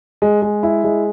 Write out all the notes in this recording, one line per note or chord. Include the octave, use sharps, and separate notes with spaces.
G#3
G#3
E4
G#3